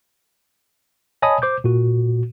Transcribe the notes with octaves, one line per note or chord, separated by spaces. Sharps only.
C#5 D#5 G#5 A5 B5 D#6
C5 D6 G6
A#2 F#4